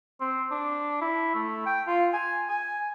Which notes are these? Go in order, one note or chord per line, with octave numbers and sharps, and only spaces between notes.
C4
D4
E4
A3
G5
F4
G#5
G#5